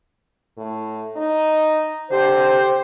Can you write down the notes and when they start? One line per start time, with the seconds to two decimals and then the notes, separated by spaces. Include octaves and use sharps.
0.57 A2
1.16 D#4
2.10 D3 G4 C5